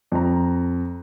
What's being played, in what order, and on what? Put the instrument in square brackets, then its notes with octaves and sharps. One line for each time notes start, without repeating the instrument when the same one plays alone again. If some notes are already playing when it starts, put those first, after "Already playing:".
[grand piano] F2 A#5